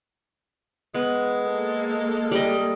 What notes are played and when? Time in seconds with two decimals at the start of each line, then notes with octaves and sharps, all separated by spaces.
0.94 G#3 B3
1.43 A#3 A4
2.31 G3 D#5